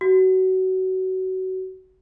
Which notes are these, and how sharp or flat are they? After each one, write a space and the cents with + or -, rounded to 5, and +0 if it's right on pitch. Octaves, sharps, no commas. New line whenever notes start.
F#4 +25